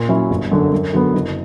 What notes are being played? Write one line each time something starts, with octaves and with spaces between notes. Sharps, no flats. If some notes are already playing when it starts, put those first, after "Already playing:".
Already playing: A#2
F#3 C#4 E4
G1
F#2 D3
F#2
D3 F#3 B3
F#1